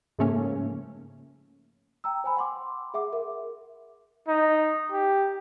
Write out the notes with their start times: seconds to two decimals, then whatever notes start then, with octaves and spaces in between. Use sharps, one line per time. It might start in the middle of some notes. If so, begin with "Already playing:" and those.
0.19 G#2 C#3 F3 A3 A#3 C#4
2.04 G5 A#5 E6
2.24 C5 G#5 B5
2.37 F#5 C6 D6
2.94 G#4 E5 F#5 D6
3.13 A#4 E5
4.28 D#4
4.92 G4